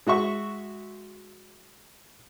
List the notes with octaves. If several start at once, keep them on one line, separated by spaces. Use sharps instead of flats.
G#3 F#4 E5 C#6